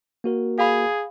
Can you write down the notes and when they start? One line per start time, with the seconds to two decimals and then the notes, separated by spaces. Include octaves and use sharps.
0.24 A#3 F#4 A#4
0.58 G#4 F5 B5